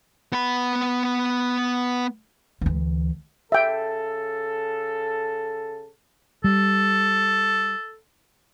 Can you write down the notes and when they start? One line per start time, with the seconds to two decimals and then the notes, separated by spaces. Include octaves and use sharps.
0.32 B3 B5
2.61 D2 E3
3.52 C#3 A4 E5 G5
6.44 G3 A4